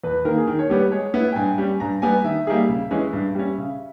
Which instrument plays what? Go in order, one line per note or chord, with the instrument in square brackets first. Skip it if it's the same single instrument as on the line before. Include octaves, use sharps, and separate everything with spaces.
[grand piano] E2 [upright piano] B4
[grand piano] D#3 A#3 [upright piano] A#4
[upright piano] G#4
[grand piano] D#3 [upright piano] A#4
[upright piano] C#5
[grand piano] G3 B3 G4 [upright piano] C#5
[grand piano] G#3 [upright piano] C#5
[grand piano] B3 E4
[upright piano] G5
[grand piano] G2 [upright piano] G#5
[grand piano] G3 C#4
[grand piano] G2 [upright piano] A#5
[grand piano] G3 B3 G4 [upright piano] G#5
[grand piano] D#3 [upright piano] E5
[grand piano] G3 A#3 D#4 G#4
C#3
E3 G#3 C#4
G2
G3 C#4
C#3